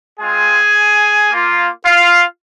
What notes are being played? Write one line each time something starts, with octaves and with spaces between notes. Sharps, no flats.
G#3 C4 F4 G#4 G#5
A#3 F4
F4 F5